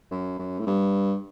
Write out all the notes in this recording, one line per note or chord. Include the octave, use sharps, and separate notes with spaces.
F#2
F#2
A2
G2